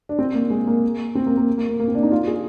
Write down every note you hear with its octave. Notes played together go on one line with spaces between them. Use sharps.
D4
C4
A#3
G#3
A#3
C4
A#3
A#3
A#3
A#3
A#3
C4
D4
D#4
F4
G#4